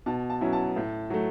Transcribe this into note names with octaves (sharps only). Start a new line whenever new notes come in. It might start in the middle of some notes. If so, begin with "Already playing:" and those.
B2 A5
A5
F#3 C#4 E4
A5
A2
F#3 A3